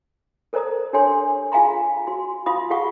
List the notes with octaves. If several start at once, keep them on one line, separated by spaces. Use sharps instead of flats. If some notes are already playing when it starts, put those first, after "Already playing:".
A4 A#4 C5 D5 A#5 D#6
D4 G4 A4 C#5 G#5 C6
F4 G#4 F5 G#5 A#5 C6
F#4 C6
F4 F5 B5 C6 D#6
F4 G4 G#4 F5 F#5 C#6